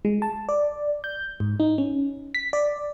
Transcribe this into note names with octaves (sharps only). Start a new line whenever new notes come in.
G#3
A5
D5
G6
G#2
D#4
C#4
B6
D5